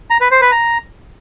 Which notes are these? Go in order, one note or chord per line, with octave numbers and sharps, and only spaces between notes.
A#5
B4
C5
B4
A#5